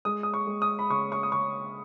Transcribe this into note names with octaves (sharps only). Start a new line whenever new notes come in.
G#3 D#6
D#6
C#6
G#3
D#6
B5
C#3 C#6
C#6
D#6
C#3 C#6